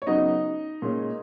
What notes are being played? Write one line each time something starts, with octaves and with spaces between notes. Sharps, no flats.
C#5
C#3 F#3 B3 D#4 D#5
A#2 G#3 C#4